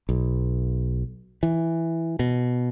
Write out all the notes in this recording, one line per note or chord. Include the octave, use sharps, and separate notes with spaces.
B1
E3
B2